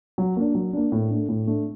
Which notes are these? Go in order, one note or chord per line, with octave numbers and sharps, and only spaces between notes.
F#3
A#3 D4
F#3
A#3 D4
A2
A3 D4
A2
A3 D4